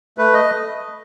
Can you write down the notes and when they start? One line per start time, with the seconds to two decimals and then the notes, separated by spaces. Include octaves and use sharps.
0.18 A3 B4
0.34 D#5